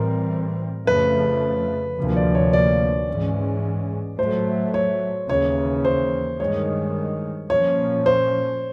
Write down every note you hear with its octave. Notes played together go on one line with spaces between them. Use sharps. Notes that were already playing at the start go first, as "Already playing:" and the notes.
Already playing: A2 E3 G3 C4 A#4
F2 C#3 F3 A3 B4
D2 C3 F3 A#3
D5
C#5
D5
G#2 E3 G#3 C#4
A2 F#3 A3 C5
C#5
D#2 C#3 E3 C#5
C5
G2 D#3 G#3 C#5
A#2 F3 A#3 C#4 C#5
C5